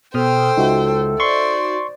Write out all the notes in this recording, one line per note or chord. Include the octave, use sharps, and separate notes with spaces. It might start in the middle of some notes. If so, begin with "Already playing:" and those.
B2 A4 C5 G5 D#6 F6
C#2 D#4 F#4 E5
C5 D5 C6 C#6